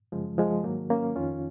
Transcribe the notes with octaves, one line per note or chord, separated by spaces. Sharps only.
F#2 C#3 F3 G#3
F3 G#3
G#2 D#3 F#3 A#3
A#3 C#4
F2 D#3 C#4 F4